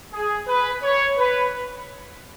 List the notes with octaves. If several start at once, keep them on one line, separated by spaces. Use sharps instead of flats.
G#4
B4
C#5
B4